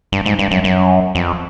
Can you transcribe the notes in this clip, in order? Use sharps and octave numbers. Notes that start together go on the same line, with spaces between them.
G2
G#2
G2
F#2
F#2
F2